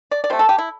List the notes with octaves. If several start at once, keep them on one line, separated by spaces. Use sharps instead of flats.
D5
D5
C3 A3 C5
A4
G4
E4